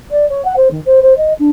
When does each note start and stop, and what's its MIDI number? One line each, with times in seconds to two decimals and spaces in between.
0.10 0.27 74
0.29 0.44 73
0.44 0.53 78
0.56 0.68 72
0.70 0.80 51
0.85 0.99 72
1.02 1.16 72
1.17 1.32 75
1.39 1.50 62